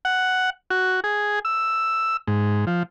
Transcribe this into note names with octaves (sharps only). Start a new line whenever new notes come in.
F#5
F#4
G#4
E6
G#2
F3